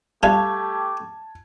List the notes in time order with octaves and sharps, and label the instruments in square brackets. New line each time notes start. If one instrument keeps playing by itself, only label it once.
[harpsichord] G3 F4 B4 [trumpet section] A3 G4 [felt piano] A5 G#6